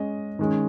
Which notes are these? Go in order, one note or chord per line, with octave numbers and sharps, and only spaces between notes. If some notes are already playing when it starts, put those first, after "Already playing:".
Already playing: G#3 C#4 G#4 D#5
D#3 G#3 C#4